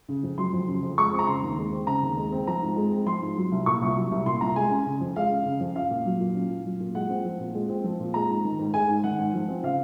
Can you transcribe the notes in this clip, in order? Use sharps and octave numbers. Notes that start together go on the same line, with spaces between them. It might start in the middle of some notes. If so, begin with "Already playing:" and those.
C#3
F2
F#3 C6
F2
C#3
F2
G#3 C#6
C4
A#5
C#3 C6
D#2
G#3
C4
C#3 A#5
D#2
G#3
C4
F3 A#5
G#2
G#3
C4
F3 C6
G#2
F#3
C2
A#2 C#6
C2
F#3
C2
A#2 C6
C2 A#5
G#3 G#5
C#4
C#3
F2
G#3 F5
C#4
C#3
F2
C#4 F5
A#2
F#3
A#2
C#4
A#2
F#3
A#2
G#3 F#5
C4
F3
A#2
G#3
C4
F3
A#2
G#3 A#5
G#2
D#3
G#2
G#3 G#5
G#2
D#3 F#5
G#2
F3
C4
C#3 F5